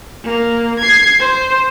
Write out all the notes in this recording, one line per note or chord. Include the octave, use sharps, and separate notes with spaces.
A#3
G#6 C7
C5